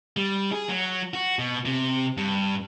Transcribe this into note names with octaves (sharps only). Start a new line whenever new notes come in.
G3
G#4
F#3
F#4
B2
C3
G2